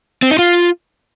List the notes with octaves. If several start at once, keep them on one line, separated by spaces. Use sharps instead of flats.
C4
D#4
F4